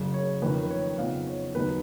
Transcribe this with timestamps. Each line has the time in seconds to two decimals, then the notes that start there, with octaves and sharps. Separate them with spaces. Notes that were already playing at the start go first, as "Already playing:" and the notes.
Already playing: F#1 F#2 C#3
0.14 C#5
0.42 F2 D#3 A#3 C#4 B4
0.63 B4
0.70 C#5
0.98 F#1 F2 F3 B3 D#4 F5
1.27 C#5
1.54 D#2 D#3 F#3 B3 D#4 B4